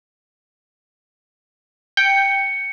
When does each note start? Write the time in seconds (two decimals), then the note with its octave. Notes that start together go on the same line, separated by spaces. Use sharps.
1.97 G5 C#7